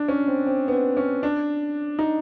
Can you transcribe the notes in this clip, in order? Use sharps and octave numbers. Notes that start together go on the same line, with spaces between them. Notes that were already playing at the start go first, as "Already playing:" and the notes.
Already playing: D4
C#4
C4
C4
B3
C4
C#4
D4
D#4